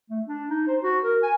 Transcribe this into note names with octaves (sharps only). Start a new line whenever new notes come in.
A3
D4
D#4
C5
F#4
A#4
G#5